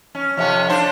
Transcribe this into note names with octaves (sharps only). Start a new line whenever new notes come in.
C#4
F2 C3 C#4
D4 C5